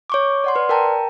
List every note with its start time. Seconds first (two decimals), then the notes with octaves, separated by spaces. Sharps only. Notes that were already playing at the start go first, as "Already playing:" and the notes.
0.10 C#5 C#6 D6
0.44 D5 F#5 C6
0.56 B4 D5
0.69 A#4 G5 A5 A#5